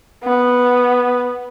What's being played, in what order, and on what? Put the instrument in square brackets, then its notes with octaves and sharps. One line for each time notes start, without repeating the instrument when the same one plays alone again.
[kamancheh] B3